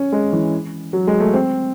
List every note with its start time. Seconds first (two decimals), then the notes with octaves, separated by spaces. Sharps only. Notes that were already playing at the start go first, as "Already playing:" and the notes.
Already playing: C#4
0.12 G#3
0.33 E3
0.93 F#3
1.07 G#3
1.20 A3
1.34 C4